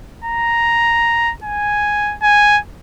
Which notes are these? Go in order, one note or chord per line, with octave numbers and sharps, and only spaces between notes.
A#5
G#5
G#5